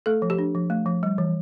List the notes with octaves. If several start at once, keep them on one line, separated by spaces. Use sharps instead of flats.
A3 A4
F3
G4
D4
F3
A3
F3
G3
E3